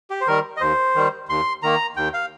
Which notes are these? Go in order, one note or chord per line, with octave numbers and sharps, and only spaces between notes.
G4
C5
D#3 G3 A#4
D#5
D#2 C5
D#3 G3
D#2 C6
D#3 A#3 A#5
D#2 G5
F5